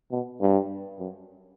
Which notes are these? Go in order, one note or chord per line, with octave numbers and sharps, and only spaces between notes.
B2
G2
F#2